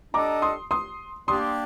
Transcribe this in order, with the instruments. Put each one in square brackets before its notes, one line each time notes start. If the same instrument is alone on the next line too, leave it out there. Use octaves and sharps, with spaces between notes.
[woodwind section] G3 D4 A4 D#5 [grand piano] A#5 D6
[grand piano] C6 D#6
C6 D#6
[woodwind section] G3 A#3 D4 G4 [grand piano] C6 D#6